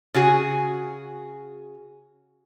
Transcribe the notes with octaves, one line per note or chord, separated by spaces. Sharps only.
C#3 F#4 G#4